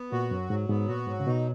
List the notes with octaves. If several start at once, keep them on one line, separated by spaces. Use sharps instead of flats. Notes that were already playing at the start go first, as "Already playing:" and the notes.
Already playing: B3
A#2 F#4
F#2 F#3
G#2 F#3
G#2 B3
A#2 F#4
G#2 F#3
C#3
B2 D#4